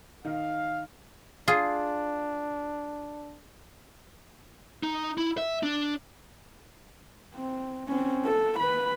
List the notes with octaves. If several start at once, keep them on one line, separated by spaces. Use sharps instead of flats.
D#3 D#4 F5
D4 F4 G#4
D#4
E4
E5
D4
C4
C4 C#4
A4
B4 B5